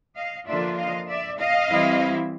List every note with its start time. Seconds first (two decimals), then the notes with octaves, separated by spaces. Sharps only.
0.16 D#5 F5
0.47 D3 F3 A#3 D4 F4 D5 E5
0.77 D#5 F5
1.08 D5 E5
1.39 D#5 F5
1.69 E3 G3 C4 E4